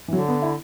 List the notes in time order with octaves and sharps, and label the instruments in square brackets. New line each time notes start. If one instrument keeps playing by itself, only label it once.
[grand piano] E3
[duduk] D3 [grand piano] F#3
[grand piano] B3
E4